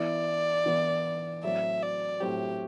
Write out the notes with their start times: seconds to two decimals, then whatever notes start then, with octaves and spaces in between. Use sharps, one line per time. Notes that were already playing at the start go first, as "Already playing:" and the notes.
Already playing: E3 B3 E4 D5
0.66 E3 B3 E4
1.43 A2 F#3 C4 E5
1.82 D5
2.21 A2 F#3 C4 G4